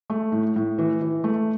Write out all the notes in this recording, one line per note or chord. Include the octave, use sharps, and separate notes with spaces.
A3
A2
A2
E3
E3
A3